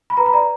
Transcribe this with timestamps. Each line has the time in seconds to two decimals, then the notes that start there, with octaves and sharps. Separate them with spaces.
0.10 B5
0.17 B4 A#5
0.26 B5
0.33 D5 A#5